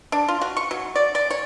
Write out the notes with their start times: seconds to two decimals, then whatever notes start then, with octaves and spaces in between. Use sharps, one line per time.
0.12 D4
0.28 F4
0.41 F#4
0.57 C#6
0.71 F#3
0.95 D5
1.15 D5
1.31 C#5